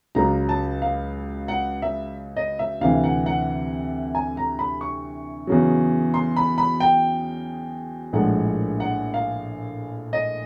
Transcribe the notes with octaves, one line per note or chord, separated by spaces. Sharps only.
C#2 C#3 F#3 A#5
A5
F5
F#5
E5
D#5
E5
D2 C3 E3 F5
F#5
F#5
G#5
A#5
B5
C#6
E2 C#3 F#3
C6
B5
B5
G5
A#1 A2 F3 G#3 F#5
F#5
F5
D#5